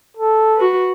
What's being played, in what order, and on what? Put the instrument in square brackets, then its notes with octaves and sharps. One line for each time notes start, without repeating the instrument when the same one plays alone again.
[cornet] A4
[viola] F#4 B4